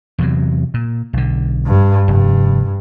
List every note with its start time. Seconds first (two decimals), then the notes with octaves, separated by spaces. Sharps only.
0.19 E2 C3 F#3
0.74 A#2
1.13 B1 D3
1.66 G2
2.08 F1 G2